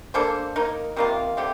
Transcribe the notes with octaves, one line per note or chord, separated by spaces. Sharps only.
A#3 D4 A4 C5
A#3 D#4 A#4
C3 D#3 A#3 F4
D3 A3 C4 G4